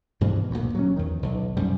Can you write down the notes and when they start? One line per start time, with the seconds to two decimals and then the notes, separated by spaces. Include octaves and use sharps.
0.21 G2 B2 E3 F3
0.51 D2 A#2
0.75 F#3 C#4
0.96 E2 D#3
1.23 B1
1.57 F#2 C3 G3